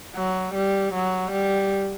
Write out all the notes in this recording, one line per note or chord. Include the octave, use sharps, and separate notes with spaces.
F#3
G3
F#3
G3